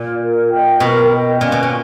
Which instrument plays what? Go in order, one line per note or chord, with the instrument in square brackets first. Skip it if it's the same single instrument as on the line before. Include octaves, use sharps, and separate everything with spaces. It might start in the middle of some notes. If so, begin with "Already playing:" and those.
Already playing: [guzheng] A#2
[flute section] A#4
D#5 G5
[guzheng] B2 [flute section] A#4
[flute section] D#5 G5
[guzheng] A#2 [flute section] C#4
[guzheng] B2
A#2